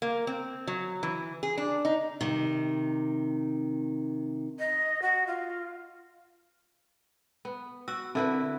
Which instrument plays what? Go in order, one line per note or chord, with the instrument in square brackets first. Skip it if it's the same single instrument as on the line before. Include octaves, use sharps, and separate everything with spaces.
[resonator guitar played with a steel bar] A#3
C4
F#3
E3
G#4
D4
D#4
[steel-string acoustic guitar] C3 D#3
[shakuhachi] D#5
F#4
F4
[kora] B3
[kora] F#4 [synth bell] E6
[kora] D3 E4 B4 [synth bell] C4 E5